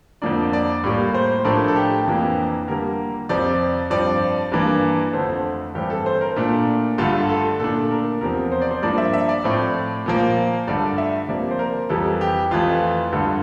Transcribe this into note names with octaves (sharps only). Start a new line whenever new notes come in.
F2 D3 F3 A#3 D4 D5
D5
A2 G3 A#3
C5
A2 F3 A3 D4 A#4
A4
G4
F2 C3 E3 A#3 D4
D3 G3 A#3 A#4
F2 C3 F3 C4 D5
G2 F3 C4 D5
G2 E3 A#3 D4
F2 D3 A3 C5
G2 E3 A3 C4 G4
A4
C5
A#4
A#2 A3 D4
G2 D3 A3 F4
A4
A#2 A3 D4 A4
A#4
E2 C3 F3 A#4
C5
D5
C5
G2 F3 A#3 D4 D5
E5
E5
D5
A2 F3 C4
A#2 F3 A#3
G2 D3 A3 D5
E5
C3 F3 A#3 D5
C5
A#4
F2 C3 E3 G3 A4
G4
F2 E3 A3 F4
G2 D3 A3